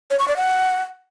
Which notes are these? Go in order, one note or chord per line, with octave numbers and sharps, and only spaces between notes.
C#5
C#6
D5
F#5